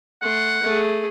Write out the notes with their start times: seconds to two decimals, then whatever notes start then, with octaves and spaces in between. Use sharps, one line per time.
0.22 A3 F#5 C6
0.63 A3 G#4